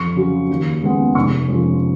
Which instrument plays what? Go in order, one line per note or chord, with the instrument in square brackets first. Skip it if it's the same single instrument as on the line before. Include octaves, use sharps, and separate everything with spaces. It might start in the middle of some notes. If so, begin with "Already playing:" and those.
Already playing: [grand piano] F2 C#6
C#3 F#3
D#2
C#3 G#3 B3
F1 C#6
F2 F3 G#3 C#4